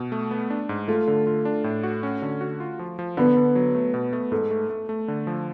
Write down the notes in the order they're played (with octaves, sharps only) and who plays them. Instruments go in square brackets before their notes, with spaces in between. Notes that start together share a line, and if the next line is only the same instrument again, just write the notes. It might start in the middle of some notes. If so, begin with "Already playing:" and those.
Already playing: [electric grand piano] B2
A3
B3
D4
G#2
[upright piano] A3 [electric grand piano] F4
[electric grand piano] D3
F4
D4
A2
F#4
C#4
D3
F#4
F4
F3
F3
[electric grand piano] D3 [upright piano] B3
[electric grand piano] D3
F#3
A3
B2
A3
[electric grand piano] G#2 [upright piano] A4
[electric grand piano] A3
A3
A3
D3
F3